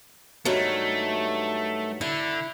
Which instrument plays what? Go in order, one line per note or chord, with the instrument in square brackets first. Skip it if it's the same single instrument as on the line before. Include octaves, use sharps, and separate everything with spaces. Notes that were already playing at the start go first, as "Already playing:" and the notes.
[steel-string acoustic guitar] G2 D#3 F#3 [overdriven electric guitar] A3
[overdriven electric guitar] D3 [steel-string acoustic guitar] E4